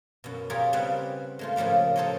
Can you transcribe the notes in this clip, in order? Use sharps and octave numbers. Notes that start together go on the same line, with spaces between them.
F#2 B2
F4 G4 G#4 A#4 C#5 D5
C#3 G3 B3 C4 F#5
G#3 A3 F4
A2 C#3 F3 G3 A#3
A4 A#4 C5 C#5 D#5